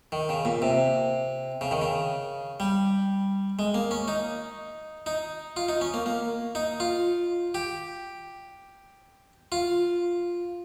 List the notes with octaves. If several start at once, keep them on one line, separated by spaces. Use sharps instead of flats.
D#3
C#3
A#2
C3
C#3
D#3
C#3
G3
G#3
A#3
C#4
D#4
D#4
F4
D#4
C#4
A#3
A#3
D#4
F4
G4
F4